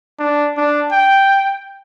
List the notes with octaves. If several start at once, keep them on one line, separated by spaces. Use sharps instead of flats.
D4
D4
G5